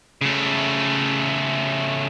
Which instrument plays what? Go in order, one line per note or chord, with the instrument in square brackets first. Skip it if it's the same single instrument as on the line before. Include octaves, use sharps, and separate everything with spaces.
[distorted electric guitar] C#3 A3